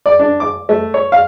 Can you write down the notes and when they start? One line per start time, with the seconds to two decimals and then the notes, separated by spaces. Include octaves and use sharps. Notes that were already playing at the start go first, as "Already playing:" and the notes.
0.06 D5
0.19 D4
0.40 D6
0.69 A3
0.94 C#5
1.12 F5